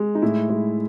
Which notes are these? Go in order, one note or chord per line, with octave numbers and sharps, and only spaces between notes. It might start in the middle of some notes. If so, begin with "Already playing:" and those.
Already playing: G#3
D#4
A2 E4
G#3